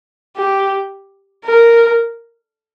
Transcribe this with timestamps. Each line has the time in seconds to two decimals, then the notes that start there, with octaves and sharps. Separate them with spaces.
0.37 G4
1.45 A#4